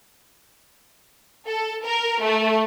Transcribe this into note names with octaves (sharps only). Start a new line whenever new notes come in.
A4
A#4
A3